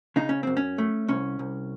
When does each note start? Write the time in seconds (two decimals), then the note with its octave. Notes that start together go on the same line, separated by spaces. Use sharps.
0.16 C#3 D#4
0.29 C#4
0.43 F#2 C4
0.57 C#4
0.78 A3
1.08 C2 C#4
1.39 C2